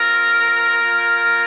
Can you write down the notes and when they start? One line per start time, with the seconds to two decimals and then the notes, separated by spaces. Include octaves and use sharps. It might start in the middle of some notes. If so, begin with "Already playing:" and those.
Already playing: C4 F4 A#4
0.81 A#3 F4